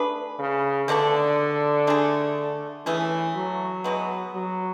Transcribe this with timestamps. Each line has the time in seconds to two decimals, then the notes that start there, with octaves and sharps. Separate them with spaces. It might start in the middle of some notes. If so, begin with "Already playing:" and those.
Already playing: A3 D4 G#4 B4
0.39 C#3
0.88 B2 D3 A3 D4 A4
1.87 A3 D4 G#4
2.86 E3 A3 C#4 G#4 B4
3.36 F#3
3.84 B2 G#3 B3
4.34 F#3